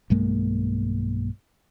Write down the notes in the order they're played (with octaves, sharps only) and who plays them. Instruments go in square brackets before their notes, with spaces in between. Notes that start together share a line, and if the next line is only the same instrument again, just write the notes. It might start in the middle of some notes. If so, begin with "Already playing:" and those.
[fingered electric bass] B1 G2 G#3 A#3